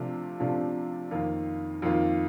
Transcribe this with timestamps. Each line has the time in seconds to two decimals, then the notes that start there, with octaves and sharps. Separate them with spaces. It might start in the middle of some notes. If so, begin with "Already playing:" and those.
Already playing: C3 F3 A3 D4 F4
0.40 C3 F3 A3 D4 F4
1.11 F2 D#3 A#3 F4
1.82 F2 D#3 A#3 F4